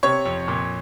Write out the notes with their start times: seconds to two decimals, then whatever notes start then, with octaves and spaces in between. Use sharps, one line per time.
0.03 C3 C#5 C#6
0.26 F2
0.48 A#2